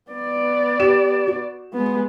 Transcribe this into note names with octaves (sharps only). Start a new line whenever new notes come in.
B3 D5
G4 E7
F#4
G#3 B3